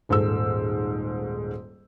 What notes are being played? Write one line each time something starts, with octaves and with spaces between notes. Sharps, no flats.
D#1 G#2 A4 E6